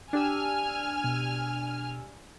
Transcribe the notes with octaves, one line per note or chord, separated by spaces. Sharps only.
D4 G4 G#5 E6 F6
B2